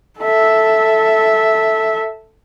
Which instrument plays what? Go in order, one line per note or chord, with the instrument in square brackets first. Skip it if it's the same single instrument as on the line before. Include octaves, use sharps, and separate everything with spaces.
[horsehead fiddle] A4 E5